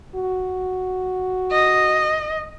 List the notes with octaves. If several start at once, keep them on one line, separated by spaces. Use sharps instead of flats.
F#4
D#5